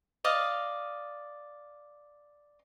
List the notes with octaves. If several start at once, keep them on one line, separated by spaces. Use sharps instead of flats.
D5 D#5 F5